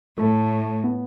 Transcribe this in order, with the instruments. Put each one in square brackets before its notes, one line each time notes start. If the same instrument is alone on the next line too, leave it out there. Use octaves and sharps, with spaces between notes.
[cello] A2 [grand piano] A3
[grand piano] B3